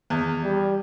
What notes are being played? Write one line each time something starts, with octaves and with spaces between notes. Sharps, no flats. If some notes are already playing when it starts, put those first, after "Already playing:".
E2
G3